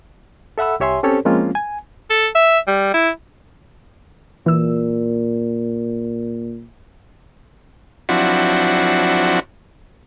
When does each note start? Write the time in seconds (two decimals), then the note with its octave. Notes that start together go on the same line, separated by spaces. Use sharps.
0.58 A4 E5 F#5 B5 E6
0.80 C2 G4 C#5 E5 G#5 C6
1.03 C4 C#4 G4 A4 C5 C#5
1.25 F3 G#3 A#3 C4 C#4 F4
1.55 G#5
2.10 A4
2.35 E5
2.68 G3
2.94 E4
4.46 A#2 E3 E6
8.09 F3 F#3 C4 D4 E4 F#4